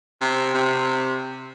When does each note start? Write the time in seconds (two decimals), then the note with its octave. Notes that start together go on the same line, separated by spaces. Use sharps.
0.21 C3
0.54 C3